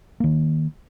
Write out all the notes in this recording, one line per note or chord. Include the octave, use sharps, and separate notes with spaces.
D#3 A#3